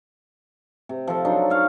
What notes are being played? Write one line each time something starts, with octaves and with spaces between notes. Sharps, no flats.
C3
F3 A4
F#3 D4 D#4
C#5 F5